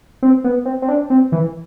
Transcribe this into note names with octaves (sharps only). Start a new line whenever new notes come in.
C4
B3
C4
C4
D4
C4
E3